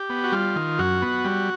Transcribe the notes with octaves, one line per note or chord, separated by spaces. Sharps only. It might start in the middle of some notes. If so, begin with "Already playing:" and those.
Already playing: G4
B3
F#4
G3 F4
D#3
F#2 F#4
B3
G3